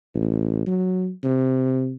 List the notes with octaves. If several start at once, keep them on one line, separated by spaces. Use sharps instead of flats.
A1
F#3
C3